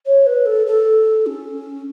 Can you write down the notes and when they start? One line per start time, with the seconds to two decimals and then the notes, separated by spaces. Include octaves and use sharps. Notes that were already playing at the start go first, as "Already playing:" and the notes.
0.06 C#5
0.26 B4
0.46 A4
0.66 A4
1.26 C#4